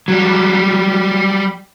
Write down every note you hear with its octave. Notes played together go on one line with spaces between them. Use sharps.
F#3 G3